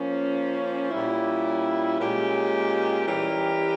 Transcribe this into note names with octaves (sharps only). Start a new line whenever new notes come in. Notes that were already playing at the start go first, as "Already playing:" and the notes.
Already playing: F3 A#3 C#4
A#2 G3 C#4 E4
A#2 G#3 C#4 G4
E3 G3 C#4 G4 A#4